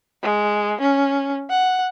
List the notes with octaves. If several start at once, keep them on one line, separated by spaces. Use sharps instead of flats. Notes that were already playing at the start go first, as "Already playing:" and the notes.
G#3
C#4
F#5